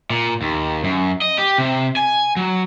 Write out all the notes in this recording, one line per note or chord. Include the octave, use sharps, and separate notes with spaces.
A#2
D#2
F#2
D#5
G4
C3
G#5
F#3